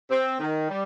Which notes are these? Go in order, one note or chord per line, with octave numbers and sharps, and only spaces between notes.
C4
D#3
G3